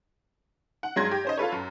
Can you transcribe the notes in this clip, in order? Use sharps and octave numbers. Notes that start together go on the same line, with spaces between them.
F#5
G2 F#3 G#3 C6 G#6 A#6
G4
C#4 C5 D#5
F4 A4 B4 C#5
F#2